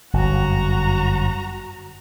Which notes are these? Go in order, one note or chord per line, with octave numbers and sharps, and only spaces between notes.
G1 F#2 F#4 A#5